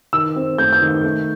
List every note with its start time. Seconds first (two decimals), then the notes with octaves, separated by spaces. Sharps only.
0.13 D#3 E6
0.36 C4
0.58 A3 G6
0.73 G6
0.82 D#3
1.04 A3